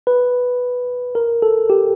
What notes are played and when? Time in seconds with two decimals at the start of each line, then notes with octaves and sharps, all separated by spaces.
0.07 B4
1.15 A#4
1.42 A4
1.70 G4